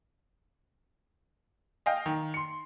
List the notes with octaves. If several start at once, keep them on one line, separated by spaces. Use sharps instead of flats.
D#5 F5 G5
D#3
C6 C#7